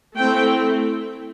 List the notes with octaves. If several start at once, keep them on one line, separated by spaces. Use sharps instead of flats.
A3 C4 E4 G5